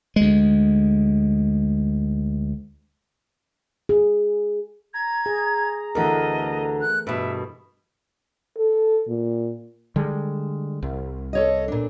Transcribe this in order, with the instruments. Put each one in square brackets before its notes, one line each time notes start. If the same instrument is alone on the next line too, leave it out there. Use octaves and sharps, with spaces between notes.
[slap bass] D2 G#3
[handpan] G#4
[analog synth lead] A#5 [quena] G#6
[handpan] G#4
[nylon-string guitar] D2 D3 [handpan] E3 A3 A#4 [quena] D#5
[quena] F#6
[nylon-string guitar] G2 B2 [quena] E5
[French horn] A4
A#2
[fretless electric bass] D3 G3 G#3
C2
[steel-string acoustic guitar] A4 C#5 D#5
A#2 D4